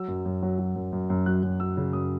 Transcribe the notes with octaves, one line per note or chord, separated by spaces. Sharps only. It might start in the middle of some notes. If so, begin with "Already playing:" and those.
Already playing: F#3 E6
F#2
F#2
F#3
F#3
F#2
F#2
F#2
F#3 F#6
F#2
F#3 E6
C#3
F#2 D#6